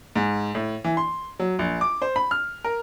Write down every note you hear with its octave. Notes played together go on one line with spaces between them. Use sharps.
G#2
A2
E3
C6
F#3
A#1
D6
C5
B5
F6
A#4